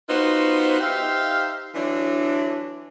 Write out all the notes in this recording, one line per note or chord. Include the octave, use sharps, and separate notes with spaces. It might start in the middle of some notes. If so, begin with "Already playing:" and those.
B3 D#4 F4 F#4 B4 C5
D#4 G4 C5 E5 F5
D3 E3 F#3 D4